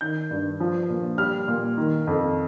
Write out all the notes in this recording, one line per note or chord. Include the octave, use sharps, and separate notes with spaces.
D#3 G6
G2
F3
A#2
G3 F6
A#2
D#3
F2